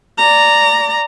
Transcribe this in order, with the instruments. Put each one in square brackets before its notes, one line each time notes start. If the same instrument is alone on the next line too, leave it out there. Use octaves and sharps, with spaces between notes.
[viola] D5 A#5